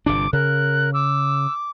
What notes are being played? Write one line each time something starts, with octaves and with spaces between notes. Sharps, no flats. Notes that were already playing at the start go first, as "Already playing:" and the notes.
G1 C3 D4 D6
C#3 A#4 F#6
D6 E6